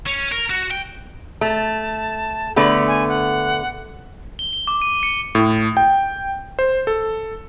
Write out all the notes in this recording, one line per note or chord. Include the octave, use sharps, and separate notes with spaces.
C#4
A#4
F#4
G5
A3 A5
D3 A3 B3 B5
G#5
F#5
G7
G7
D6
D#7
C#7
A2
G5
C5
A4